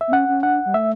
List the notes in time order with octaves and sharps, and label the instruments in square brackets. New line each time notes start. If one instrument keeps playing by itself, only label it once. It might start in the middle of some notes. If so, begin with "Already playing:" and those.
[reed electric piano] E5
[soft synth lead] B3
[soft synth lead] C#4 [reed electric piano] F#5
[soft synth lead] C#4
[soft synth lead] D4 [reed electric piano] F#5
[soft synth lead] G3
[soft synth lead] A3 [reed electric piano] E5